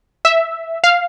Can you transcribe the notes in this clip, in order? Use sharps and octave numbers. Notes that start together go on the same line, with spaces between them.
E5
F5